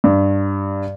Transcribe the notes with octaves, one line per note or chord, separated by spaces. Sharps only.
G2